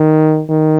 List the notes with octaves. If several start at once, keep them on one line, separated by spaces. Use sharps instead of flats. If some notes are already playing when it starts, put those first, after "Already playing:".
Already playing: D#3
D#3